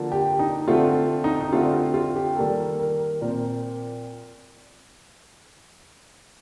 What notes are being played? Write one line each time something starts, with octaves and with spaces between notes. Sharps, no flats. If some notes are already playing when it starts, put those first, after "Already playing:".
Already playing: D3 F3 A#3
G4
D#4
D3 F3 A3 C4 F4
D#4
D#4
D3 A3 C4 F4
F4
F4
G4
D#3 G3 A#3 A4
A#4
A#2 F3 C4 A#4